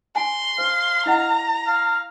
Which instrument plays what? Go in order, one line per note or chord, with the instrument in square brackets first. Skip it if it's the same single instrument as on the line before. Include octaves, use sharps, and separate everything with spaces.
[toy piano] G#5 [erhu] C6
[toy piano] C5 [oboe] F5
[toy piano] E4 D#5 F#5 [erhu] A#5
[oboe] F5